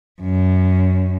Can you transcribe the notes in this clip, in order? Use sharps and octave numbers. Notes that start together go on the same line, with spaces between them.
F#2